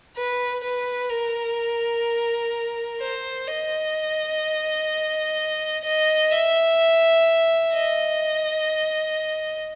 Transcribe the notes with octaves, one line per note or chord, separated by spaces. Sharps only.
B4
B4
A#4
C5
D#5
D#5
E5
D#5